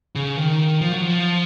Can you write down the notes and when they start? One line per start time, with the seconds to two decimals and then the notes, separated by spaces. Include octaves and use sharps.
0.15 C#3
0.37 D#3
0.81 F3
0.92 F#3
1.02 F3